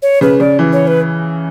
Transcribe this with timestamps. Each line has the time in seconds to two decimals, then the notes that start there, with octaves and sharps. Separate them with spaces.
0.02 C#5
0.21 C#3 B4
0.40 C#3 D5
0.59 E3
0.73 C#5
0.87 B4